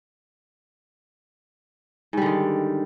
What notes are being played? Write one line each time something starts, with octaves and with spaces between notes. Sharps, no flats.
G#2 D3 D#3 G3